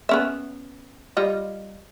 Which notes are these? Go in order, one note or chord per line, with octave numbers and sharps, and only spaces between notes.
B3 C#4 E5
G3 F4 D#5